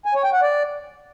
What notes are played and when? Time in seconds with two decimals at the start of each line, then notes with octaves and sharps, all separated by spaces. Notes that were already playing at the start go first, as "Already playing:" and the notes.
0.05 G#5
0.15 C#5
0.24 G5
0.33 F#5
0.42 D5